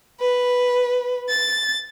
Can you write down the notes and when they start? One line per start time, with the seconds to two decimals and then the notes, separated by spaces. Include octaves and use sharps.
0.21 B4
1.30 A6